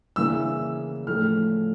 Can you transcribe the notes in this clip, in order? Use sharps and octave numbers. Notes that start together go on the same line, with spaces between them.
C#3 E3 A#3 E6
A2 F3 A3 F6